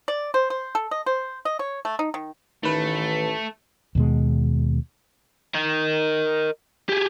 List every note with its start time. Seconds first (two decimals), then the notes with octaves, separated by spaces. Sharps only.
0.08 D5
0.34 C5
0.50 C5
0.75 A4
0.91 D#5
1.06 C5
1.45 D#5
1.59 C#5
1.85 A3
1.99 D#4
2.14 D#3
2.63 A1 D#3 A3 B4
3.95 D#2 B2 G#3
5.54 A#4 D#5
6.89 G4 G#4